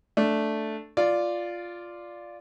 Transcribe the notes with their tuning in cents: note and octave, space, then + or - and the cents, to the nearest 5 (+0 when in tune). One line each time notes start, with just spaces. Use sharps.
A3 +0 D4 +0
F4 +0 D5 +0